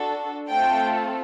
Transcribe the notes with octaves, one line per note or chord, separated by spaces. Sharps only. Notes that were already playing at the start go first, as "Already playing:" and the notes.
Already playing: D4 F#4 A4
A3 C4 F4 A4 G5